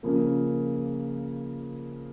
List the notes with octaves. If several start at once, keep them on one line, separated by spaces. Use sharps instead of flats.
C#3 F3 A#3